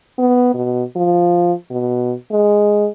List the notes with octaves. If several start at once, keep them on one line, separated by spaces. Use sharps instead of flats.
B3
B2
F3
B2
G#3